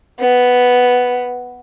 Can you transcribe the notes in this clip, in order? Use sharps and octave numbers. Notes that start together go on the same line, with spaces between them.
B3